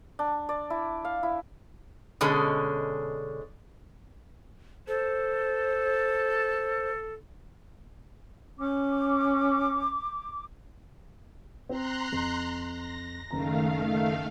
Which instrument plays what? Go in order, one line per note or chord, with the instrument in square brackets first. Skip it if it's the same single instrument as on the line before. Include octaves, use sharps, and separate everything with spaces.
[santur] D4
D5
E4
F5
E4
[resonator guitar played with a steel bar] B2 D3 G#3 C#4
[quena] A4 [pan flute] C5
[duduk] C#4 [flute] D6
[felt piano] C4 [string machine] A#5 C6 F#6
[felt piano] F2
[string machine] A#6
[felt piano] F#1 A#5 [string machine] D#3 A3 F5